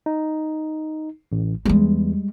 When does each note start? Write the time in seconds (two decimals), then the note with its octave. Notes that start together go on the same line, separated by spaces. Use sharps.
0.06 D#4
1.32 A1
1.65 E2 G3 G#3